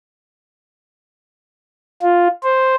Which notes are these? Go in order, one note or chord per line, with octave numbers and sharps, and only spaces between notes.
F4
C5